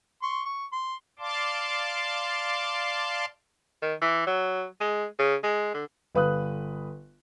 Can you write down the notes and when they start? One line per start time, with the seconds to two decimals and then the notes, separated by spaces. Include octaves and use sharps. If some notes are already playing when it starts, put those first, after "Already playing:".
0.23 C6 C#6
0.45 C#6
0.73 C6
1.19 D5 F5 A5 C6 D6
3.82 D#3
4.01 E3
4.26 F#3
4.81 G#3
5.19 C#3
5.43 G#3
5.74 D3
6.15 G1 B4 F5 D#6 F#6